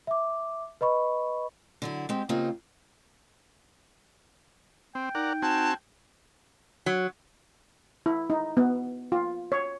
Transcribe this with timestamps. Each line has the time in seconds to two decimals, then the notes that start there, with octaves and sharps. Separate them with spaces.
0.07 E5 D6
0.81 B4 D#5 B5 C#6
1.82 D3 F#3 E4
2.09 G#3 C4 G4
2.29 C#3 A#3 C4 D#4 F4 G4
4.95 C4 G5
5.15 D#4 A#4 D5 F#5
5.42 C4 F#4 G#5 A5
6.86 F#3
8.06 E4
8.30 D#4
8.57 B3
9.12 F4
9.52 C#5